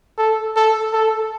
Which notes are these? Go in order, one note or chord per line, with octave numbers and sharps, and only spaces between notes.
A4
A4
A4